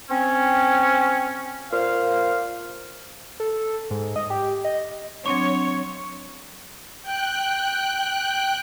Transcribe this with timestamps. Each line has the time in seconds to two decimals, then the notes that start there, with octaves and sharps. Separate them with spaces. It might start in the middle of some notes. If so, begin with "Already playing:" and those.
0.10 C4 C#4
1.72 A#2 C5 F5
3.40 A4
3.90 G#2
4.16 D#5
4.30 G4
4.64 D#5
5.26 F#3 C4 D4 C#5 C#6
7.02 G5 F#6